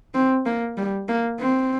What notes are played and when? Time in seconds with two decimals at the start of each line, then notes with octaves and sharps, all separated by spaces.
0.14 C4
0.46 A#3
0.77 G3
1.08 A#3
1.40 C4